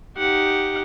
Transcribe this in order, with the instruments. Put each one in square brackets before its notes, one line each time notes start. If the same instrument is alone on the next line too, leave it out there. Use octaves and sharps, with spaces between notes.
[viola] D#4 G4 [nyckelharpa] F#5